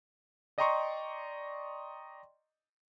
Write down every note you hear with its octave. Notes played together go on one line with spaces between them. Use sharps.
D5 D#5 G5 A#5 C6 C#6